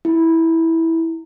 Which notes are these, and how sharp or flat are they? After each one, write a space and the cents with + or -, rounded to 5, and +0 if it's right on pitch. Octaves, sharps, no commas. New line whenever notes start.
E4 -10